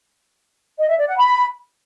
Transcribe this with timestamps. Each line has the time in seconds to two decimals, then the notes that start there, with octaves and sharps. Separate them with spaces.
0.79 D#5
0.88 E5
0.98 D5
1.08 F#5
1.17 B5